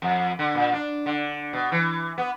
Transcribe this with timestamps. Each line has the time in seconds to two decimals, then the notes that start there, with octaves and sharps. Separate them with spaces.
0.02 F2
0.39 D3
0.55 A#2
0.73 D4
1.06 D3
1.53 B2
1.72 E3
2.18 B3